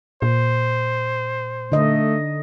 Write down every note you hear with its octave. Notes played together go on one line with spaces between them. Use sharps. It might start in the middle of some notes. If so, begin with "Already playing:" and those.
A#2 C5
D3 A3 D#5